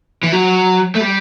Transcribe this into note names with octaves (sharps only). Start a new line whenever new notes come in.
E3
F#3
A3
G3